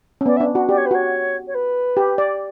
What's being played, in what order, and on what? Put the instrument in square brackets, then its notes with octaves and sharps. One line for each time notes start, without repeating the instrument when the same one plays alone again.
[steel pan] C#4
[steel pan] B3 [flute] D5
[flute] E5
[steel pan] D4
F#4
[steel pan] G4 [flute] D5
[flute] C#5
B4
[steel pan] F#4 [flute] C#5
[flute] C#5
B4
[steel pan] G4
D5